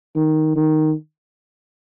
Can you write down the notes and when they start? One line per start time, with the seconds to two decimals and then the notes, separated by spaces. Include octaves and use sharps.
0.16 D#3
0.56 D#3